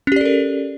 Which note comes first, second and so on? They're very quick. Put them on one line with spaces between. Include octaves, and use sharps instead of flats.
C#4 G4 D5 A4 A#4